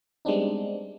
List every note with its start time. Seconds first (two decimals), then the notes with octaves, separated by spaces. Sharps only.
0.25 G3 G#3 B3 C4 D4 D#4